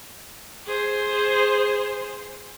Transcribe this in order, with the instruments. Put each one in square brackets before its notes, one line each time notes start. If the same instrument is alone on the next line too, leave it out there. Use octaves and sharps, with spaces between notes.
[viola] G#4 C5